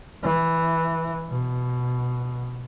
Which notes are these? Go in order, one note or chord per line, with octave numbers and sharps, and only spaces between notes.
E3
B2